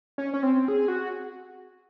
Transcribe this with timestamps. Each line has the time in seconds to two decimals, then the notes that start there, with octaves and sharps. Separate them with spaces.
0.18 C#4
0.34 C#4
0.43 C4
0.68 G#4
0.88 F#4